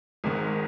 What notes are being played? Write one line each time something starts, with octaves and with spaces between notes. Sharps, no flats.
G#1 G#2 D#3